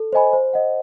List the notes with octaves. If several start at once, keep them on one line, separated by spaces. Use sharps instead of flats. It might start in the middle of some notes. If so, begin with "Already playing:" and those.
Already playing: A4
C5 D#5 G#5 B5
C5
D#5 F#5